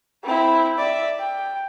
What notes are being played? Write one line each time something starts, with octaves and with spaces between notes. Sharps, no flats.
C4 E4
D5 E5
G5